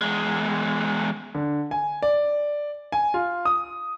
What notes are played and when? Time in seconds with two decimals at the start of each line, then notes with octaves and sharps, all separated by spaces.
0.01 E2 G#3
1.35 D3
1.71 G#5
2.02 D5
2.92 G#5
3.14 F4
3.45 D#6